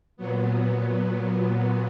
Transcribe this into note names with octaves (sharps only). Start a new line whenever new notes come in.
A#2 F#3 B3